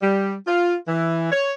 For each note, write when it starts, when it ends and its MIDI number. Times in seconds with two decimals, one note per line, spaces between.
0.02 0.34 55
0.47 0.75 65
0.88 1.30 52
1.32 1.52 73